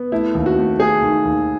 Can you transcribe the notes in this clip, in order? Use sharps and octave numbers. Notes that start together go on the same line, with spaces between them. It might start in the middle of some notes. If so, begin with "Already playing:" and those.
Already playing: B3
A3 E4
D#2
F#4
A3
A3 G#4
D#3
D#2